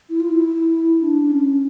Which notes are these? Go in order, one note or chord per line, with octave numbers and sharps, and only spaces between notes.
E4
F4
E4
D4
D4
C#4